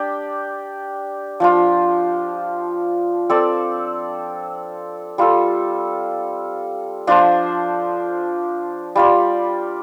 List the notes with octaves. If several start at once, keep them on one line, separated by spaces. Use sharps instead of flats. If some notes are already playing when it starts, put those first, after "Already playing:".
Already playing: D4 G4 D5
F3 D4 F4
C4 A4 D5
G3 F4 A4
F3 D4 F4 C5
G3 F4 D5